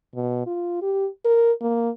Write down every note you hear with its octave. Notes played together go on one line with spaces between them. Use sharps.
B2
F4
G4
A#4
A#3